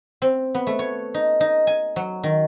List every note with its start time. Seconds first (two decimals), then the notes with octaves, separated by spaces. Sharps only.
0.22 C4
0.55 B3
0.67 A3
0.79 C#5
1.14 D#4
1.40 D#4
1.67 G#5
1.96 F#3
2.23 D#3